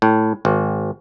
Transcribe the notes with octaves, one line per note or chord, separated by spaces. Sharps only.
A2
G#1